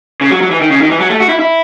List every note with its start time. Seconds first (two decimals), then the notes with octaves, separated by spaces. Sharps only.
0.21 C#3
0.31 F#3
0.41 F#3
0.51 E3
0.61 D#3
0.70 C#3
0.80 D#3
0.90 E3
1.00 F#3
1.10 A3
1.20 F#4
1.29 E4
1.39 E4